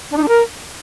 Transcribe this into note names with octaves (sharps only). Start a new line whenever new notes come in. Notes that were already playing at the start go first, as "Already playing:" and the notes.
D4
D#4
D4
A#4